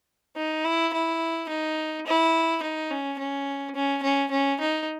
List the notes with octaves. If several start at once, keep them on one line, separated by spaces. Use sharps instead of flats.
D#4
E4
E4
D#4
E4
D#4
C#4
C#4
C#4
C#4
C#4
D#4